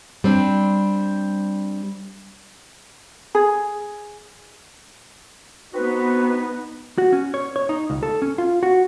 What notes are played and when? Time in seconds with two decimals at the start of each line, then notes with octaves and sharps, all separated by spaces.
0.24 G3 C4 D4
3.35 G#4
5.74 B3 C4 D#4 F#4 B4
6.98 F#4
7.13 C#4
7.34 C#5
7.56 C#5
7.69 D#4
7.90 C#2
8.03 A4
8.22 C#4
8.38 F4
8.63 F#4